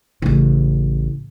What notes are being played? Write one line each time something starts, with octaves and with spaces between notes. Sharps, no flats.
A1 C#3